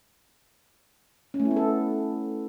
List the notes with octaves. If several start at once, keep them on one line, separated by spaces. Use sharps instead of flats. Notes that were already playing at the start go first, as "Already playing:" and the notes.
C#4
A3
E4
B3
A4